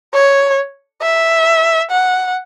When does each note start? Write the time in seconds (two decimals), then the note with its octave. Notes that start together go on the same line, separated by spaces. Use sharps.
0.14 C#5
1.02 E5
1.91 F#5